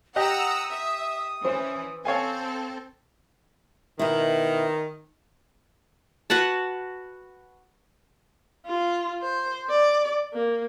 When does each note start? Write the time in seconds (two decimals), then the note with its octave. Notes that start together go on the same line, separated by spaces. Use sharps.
0.16 G4 D#5 F#5 A#5 D#6 E6
0.71 E5
1.45 E3 C#4 C5
2.05 C4 A4 C#5 F5 G#5
3.99 B2 D#3 E4
6.30 F#4 B4 F#5 A5
8.66 F4
9.22 C5
9.70 D5
10.33 A#3